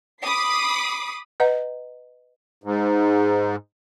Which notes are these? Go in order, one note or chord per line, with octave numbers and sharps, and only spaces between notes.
B5 D6 D#6 C7
B4 D#5 F#5 A#5
G#2